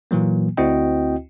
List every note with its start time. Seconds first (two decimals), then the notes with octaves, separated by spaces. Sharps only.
0.11 A#2 E3 F#3 A#3
0.57 D2 C4 E4 F#4 D#5 G5